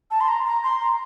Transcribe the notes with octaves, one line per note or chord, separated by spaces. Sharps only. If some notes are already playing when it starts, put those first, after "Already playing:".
A5
C6
A#5
A#5
C6
A#5